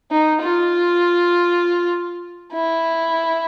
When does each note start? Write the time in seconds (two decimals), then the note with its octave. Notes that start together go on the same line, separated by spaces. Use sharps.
0.11 D#4
0.42 F4
2.53 E4